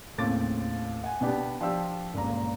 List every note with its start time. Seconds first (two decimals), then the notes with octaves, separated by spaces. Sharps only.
0.18 D#2 A2 C#3 C4 D6 A6
1.04 F#5 G#5
1.21 B2 B3 D4 G4
1.61 F3 D4 G4 E6
2.14 G1 C#2 A#2 A#5